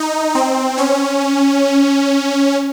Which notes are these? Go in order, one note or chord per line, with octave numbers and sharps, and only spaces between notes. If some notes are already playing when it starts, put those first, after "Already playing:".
Already playing: D#4
C4
C#4